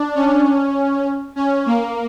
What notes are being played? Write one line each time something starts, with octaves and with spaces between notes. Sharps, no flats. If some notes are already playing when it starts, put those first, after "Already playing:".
Already playing: D4
C#4
C#4
A#3